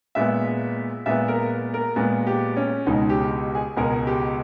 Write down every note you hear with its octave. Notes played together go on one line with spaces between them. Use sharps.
A#2 G#3 B3 E5
A#2 G#3 B3 E5
A#4
A#4
A#2 G#3 B3
G4
C#4
C#2 B2 G#3 D#4
G4
G4
G#4
C#2 B2 G#3 A#4
G4